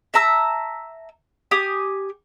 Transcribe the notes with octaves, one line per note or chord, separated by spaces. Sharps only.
E5 A5 A#5 E6
G4 G#5 D#6